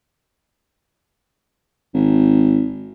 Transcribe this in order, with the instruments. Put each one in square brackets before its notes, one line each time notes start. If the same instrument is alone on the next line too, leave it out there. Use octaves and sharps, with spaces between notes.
[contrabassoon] G#1